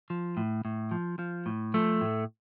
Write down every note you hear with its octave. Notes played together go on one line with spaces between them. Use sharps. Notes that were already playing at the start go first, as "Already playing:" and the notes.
F3
A2
A2
F3
F3
A2
F3 A3
A2